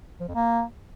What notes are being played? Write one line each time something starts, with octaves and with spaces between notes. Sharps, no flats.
F3
F2
A#3